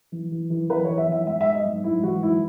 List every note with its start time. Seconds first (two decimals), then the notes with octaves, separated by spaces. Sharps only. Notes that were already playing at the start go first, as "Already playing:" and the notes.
0.12 E3
0.31 E3
0.50 E3
0.69 E3 B4
0.85 E3 C#5
0.98 E5
1.08 E3 E5
1.27 G#2 E5
1.41 G#2 E5
1.55 D#5
1.65 G#2
1.84 G#2 E4
2.03 E3 F#4
2.23 G#2 E4